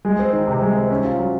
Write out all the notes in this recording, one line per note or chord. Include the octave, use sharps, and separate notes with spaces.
G#3
C4
D#3
C3
G#3
C4
C#4
F4
F#3